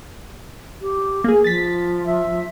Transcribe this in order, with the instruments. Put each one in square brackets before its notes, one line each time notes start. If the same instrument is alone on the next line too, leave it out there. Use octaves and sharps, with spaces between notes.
[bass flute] G4
[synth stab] A#3 G#4
[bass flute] F3 [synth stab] A6 B6
[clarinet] E5